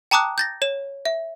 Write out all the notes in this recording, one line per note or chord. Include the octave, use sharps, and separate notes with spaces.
G5 A5 A#5 D6 D#6 F#6
G6 A6 A#6
C#5 E7
E5